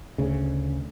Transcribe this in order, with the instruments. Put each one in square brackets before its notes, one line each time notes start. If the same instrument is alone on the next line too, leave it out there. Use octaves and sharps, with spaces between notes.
[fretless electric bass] D2 C#3